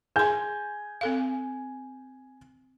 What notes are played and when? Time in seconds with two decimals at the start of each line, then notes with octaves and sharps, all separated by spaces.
0.16 G#4 G#5 C6 G6
1.01 C4 A4 F5